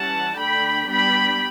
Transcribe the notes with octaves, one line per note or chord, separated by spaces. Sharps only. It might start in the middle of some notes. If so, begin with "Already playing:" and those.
Already playing: E3 G3 C#4 F#5 A5
D3 A3 D4 G5 B5
G3 B3 D4 G5 B5